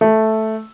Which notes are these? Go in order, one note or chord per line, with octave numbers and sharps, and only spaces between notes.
A3